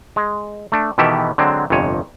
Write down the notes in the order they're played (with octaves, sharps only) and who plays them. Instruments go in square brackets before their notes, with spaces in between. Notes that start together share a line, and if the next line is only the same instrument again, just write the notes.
[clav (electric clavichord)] G#3
A3 D4
B2 D#3 E3 G4 A4 E5
D3 F#3 G#3 C4
G1 F2 C3 C#5 G#5